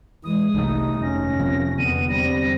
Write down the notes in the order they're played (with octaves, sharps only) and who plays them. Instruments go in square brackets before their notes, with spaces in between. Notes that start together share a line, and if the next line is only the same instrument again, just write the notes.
[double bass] E3 G#3 [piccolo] D#6
[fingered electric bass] G1 A3 [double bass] C2 [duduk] D#4
[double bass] F1 [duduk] C#4 [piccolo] A#6
[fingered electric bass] F3 A#3 C4
[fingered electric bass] E2 D3 [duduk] B3 [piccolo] D#7
[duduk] G3 [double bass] C4 [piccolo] A#6